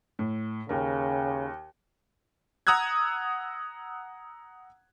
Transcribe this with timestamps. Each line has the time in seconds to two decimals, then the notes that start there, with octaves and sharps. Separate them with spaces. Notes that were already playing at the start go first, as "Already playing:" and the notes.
0.19 A2
0.69 D#2 C#3 A#4
2.67 F#5 A#5 D#6 E6 F#6 G#6